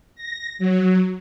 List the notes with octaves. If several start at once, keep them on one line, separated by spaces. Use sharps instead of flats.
A#6
F#3